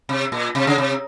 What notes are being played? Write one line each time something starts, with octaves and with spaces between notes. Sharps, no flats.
C3
A#2
C3
C#3
C3